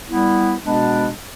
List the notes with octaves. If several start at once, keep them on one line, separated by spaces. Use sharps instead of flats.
G3 B3 E4
B2 G#3 B3 D4